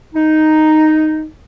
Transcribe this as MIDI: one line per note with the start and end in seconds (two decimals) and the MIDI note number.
0.15 1.26 63